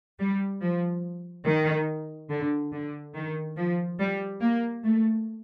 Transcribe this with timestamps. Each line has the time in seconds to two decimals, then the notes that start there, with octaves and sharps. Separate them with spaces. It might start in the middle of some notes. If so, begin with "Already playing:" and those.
0.19 G3
0.61 F3
1.45 D#3
2.30 D3
2.72 D3
3.14 D#3
3.56 F3
3.99 G3
4.41 A#3
4.84 A3